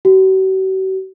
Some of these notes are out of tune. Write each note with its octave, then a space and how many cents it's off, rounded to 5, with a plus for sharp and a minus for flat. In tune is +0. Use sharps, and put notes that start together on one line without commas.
F#4 +45